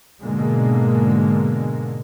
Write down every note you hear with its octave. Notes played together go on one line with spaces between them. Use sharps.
G#2 B2 D3 G#3 A#3